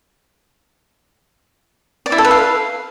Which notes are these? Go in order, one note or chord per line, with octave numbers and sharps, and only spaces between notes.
D5
E4
A4
B4
F5